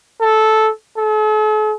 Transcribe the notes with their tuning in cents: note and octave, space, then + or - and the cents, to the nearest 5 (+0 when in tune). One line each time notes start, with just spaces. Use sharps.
A4 -10
A4 -45